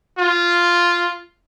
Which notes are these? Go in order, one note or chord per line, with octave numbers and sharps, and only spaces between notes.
F4